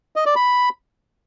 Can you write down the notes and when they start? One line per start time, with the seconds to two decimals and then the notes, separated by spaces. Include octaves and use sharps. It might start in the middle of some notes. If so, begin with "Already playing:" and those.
0.16 D#5
0.26 D5
0.36 B5